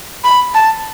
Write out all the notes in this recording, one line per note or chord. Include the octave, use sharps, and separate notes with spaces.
B5
A5